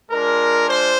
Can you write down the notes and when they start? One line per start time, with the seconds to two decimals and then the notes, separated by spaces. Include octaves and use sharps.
0.11 G#3 D4 F4 A#4
0.67 C5